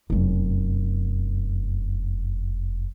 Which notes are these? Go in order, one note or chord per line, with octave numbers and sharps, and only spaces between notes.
F1 F#2